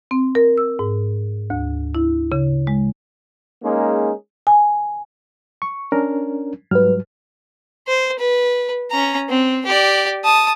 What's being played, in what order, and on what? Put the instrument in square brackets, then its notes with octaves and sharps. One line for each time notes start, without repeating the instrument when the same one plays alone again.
[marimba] C4
A#4
E6
G#2
D2
E4
C#3
G#3
[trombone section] G#3 A#3 C#4 D#4 G#4
[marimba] G#5
[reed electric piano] C#6
C#4 D4 A#4
[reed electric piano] G#2 F#3 G3 [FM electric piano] B4 F6
[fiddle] C5
B4
C#4 A#5
C4
G4 D5
A5 D#6